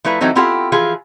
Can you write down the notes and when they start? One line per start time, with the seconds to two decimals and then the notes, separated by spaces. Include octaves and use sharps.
0.04 F3 A3 E4 B4 A#5
0.21 E3 F#3 A3 C4 D#4 A4
0.35 C4 E4 F4 G4 A4 F#5
0.72 E3 F3 F4 G#4